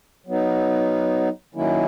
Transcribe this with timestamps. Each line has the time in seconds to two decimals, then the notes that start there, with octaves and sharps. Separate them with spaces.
0.27 F#3 B3 D#4
1.55 D#3 F#3 A#3 C#4 E4